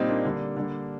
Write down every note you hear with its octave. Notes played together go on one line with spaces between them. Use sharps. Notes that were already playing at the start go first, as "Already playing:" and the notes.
Already playing: A#2 G3 C4 D#4
A#3 D4
D3 G3
D3 G3